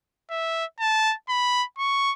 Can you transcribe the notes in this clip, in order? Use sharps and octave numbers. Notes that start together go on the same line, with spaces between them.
E5
A5
B5
C#6